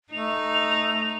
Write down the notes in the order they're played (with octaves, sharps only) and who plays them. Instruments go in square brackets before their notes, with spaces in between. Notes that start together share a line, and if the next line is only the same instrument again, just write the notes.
[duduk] A3 [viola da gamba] D#4 [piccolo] F7